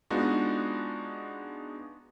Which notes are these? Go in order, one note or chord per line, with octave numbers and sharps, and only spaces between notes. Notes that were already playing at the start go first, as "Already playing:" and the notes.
G#3 B3 D4 D#4 F4 F#4